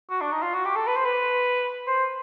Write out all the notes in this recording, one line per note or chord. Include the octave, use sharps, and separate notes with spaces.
F#4
D4
D#4
F4
F#4
G4
A4
B4
C5
B4
C5